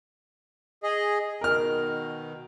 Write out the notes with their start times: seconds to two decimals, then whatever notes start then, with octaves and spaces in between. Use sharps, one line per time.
0.83 G#4 D#5
1.41 B2 D#3 A#4 F6